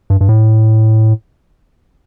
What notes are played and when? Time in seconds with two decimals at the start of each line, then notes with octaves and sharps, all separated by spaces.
0.10 G2
0.21 G2
0.29 A2